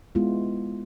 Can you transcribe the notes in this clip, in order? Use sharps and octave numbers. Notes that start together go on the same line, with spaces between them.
G#3 B3 E4 F4